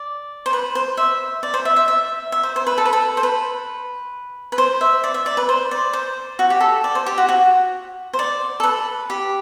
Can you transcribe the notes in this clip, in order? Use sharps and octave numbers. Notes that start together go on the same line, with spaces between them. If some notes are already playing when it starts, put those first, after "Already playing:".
Already playing: D5
C5
B4
C5
E5
D5
C5
E5
E5
E5
E5
C5
C5
B4
A4
B4
A4
C5
B4
B4
C5
E5
D5
E5
D5
B4
C5
D5
C5
F#4
G4
A4
D5
C5
G4
F#4
F#4
C5
D5
A4
B4
G4